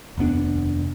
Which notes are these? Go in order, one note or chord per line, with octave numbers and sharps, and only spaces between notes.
F1 D#2 B3 D4